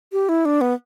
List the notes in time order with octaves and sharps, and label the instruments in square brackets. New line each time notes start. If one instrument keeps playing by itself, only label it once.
[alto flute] G4
E4
D4
B3